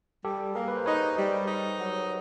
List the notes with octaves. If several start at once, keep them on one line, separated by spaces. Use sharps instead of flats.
G3 G4 A4
A#3 G#4 A#4
B4
C5
D#4 B4 C#5
G3
D#4
F#3